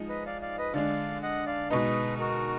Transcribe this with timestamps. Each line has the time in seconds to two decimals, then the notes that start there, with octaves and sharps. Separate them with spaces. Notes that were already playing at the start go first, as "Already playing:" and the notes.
Already playing: F3 G#3 D#4
0.09 B4 D#5
0.26 D5 F5
0.41 D5 F5
0.58 B4 D#5
0.74 D3 G#3 D4 D5 F5
1.23 D#5 F#5
1.46 D5 F5
1.70 B2 G#3 D#4 B4 D#5
2.19 F#4 A#4